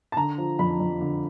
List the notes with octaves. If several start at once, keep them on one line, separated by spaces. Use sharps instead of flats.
A5
D3 A#5
F3
F2 B5
F2
D3